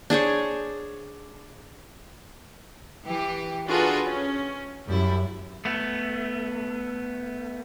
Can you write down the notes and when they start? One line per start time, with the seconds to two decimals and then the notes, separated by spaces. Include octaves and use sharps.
0.10 D4 G#4 C5 C#5
3.06 E3 G4
3.68 D4 F4 F#4 G#4 A4 B4
4.05 C#4
4.88 F#2 G3 E4
5.65 A3 B3